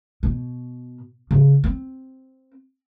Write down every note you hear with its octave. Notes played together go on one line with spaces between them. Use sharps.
B2
C#3
C4